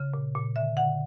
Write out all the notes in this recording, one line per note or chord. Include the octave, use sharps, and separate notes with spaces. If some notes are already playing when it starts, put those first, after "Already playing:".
Already playing: C#3
A#2
A#2
D3 E5
D3 F#5